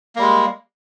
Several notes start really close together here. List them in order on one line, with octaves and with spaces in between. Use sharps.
A#3 G3 G#3